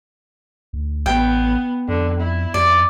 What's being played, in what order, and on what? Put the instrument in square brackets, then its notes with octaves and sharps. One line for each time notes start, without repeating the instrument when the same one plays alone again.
[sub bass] D2
[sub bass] A1 [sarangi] B3 [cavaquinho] G5
[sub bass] F2 [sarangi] D3
[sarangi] E4
[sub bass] F2 [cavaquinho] D5